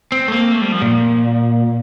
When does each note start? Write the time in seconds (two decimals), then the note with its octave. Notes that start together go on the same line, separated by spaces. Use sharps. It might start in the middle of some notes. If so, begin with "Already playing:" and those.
0.12 C4
0.28 A3
0.32 A#3
0.52 A3
0.61 G3
0.72 F3
0.82 A#2